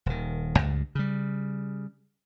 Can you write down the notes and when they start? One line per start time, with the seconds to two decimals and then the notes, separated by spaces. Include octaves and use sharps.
0.06 D#1 D#3
0.59 C#2 G2
0.95 C#3 G3